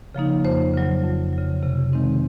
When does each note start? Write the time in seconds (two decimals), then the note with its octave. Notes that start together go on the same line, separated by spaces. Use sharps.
0.15 C#3 F3 A#3 D#4
0.44 F2 C5
0.74 C#3 F#3
1.04 F2
1.33 C#3 F#3
1.63 C3
1.92 D#3 G#3 C4 D#4